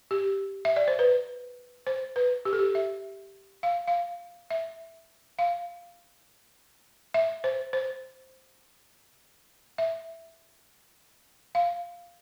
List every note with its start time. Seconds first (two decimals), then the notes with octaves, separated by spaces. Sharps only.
0.11 G4
0.65 E5
0.76 D5
0.88 C5
0.99 B4
1.87 C5
2.16 B4
2.45 G4
2.53 A4
2.59 G4
2.75 E5
3.63 F5
3.88 F5
4.51 E5
5.39 F5
7.14 E5
7.44 C5
7.73 C5
9.78 E5
11.55 F5